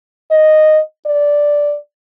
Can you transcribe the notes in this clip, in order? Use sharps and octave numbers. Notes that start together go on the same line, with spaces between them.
D#5
D5